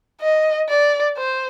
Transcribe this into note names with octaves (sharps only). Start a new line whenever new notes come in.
D#5
D5
C5